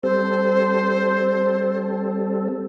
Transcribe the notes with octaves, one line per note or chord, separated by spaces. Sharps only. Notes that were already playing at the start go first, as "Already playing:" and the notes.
G3 C4 A4 C5